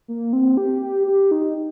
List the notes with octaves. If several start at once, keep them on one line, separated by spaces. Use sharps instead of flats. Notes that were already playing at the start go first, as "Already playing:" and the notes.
A#3
C4
G4
G4
G4
D#4